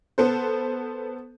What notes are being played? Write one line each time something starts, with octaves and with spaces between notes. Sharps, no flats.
B3 A4 C5